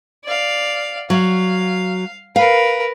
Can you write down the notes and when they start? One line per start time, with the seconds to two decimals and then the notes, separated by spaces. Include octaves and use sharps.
0.25 D5 F5
1.10 F#3 F5
2.36 A#4 B4 F5